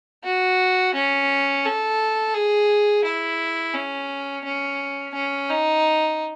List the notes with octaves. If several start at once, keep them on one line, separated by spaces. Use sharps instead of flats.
F#4
C#4
A4
G#4
E4
C#4
C#4
C#4
D#4